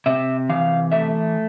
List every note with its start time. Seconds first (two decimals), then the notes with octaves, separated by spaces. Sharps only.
0.06 C3 E5
0.49 E3 F5
0.92 A3 E5